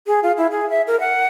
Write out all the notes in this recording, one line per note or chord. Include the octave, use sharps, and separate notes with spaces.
G#4
F4
E4
G#4
E5
A#4
F#5